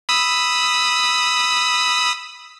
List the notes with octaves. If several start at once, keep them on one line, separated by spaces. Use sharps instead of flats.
B5 D#6 E6